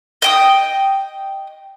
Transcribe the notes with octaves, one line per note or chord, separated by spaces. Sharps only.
D#5 G5 D#6